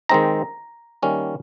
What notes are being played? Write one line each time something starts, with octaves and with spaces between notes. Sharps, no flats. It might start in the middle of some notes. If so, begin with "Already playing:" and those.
D#3 G#3 C4 D#4 A#5
D#3 G3 A#3 C#4